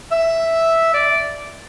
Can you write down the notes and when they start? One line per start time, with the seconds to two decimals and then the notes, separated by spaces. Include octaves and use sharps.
0.12 E5
0.94 D5